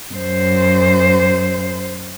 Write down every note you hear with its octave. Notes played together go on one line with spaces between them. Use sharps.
F#2 C5